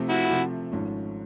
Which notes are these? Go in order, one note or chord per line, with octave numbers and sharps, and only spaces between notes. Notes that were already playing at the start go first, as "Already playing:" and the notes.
Already playing: C3 F3 A3 C4
E4 F#4
C3 F3 A3 C4
G#1 G#2 F3 A3 C#4